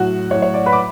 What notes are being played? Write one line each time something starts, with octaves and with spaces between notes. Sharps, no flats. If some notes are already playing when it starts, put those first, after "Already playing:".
Already playing: A2 F#3 F#4 F#5
A2 C#5
F#3
C#5
D5
B4 B5
D6